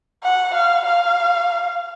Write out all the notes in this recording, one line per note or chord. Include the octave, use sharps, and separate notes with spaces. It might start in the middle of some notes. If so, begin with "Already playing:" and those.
F#5
F5
F5